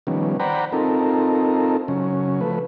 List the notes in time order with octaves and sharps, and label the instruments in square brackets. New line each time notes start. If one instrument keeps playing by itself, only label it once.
[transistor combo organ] D#3 F3 G3 B3 C#4
C5 D5 F#5 G5 A#5 B5
C4 D#4 F4 A4 A#4
C#3 F#3 C#4
F3 A3 B4